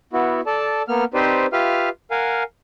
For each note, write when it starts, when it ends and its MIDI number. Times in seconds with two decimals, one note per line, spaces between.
0.13 0.41 59
0.13 0.41 64
0.13 0.41 66
0.46 0.82 69
0.46 0.82 74
0.46 0.82 81
0.88 1.04 58
0.88 1.04 59
0.88 1.04 89
1.14 1.46 60
1.14 1.46 63
1.14 1.46 67
1.14 1.46 71
1.14 1.46 72
1.14 1.46 74
1.53 1.89 65
1.53 1.89 67
1.53 1.89 71
1.53 1.89 76
1.53 1.89 77
1.53 1.89 89
2.11 2.43 70
2.11 2.43 77
2.11 2.43 78
2.11 2.43 80